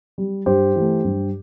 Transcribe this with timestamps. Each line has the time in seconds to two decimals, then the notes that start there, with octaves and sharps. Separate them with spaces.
0.18 G3
0.46 G2 G4 C5
0.76 E3 A3
1.04 G2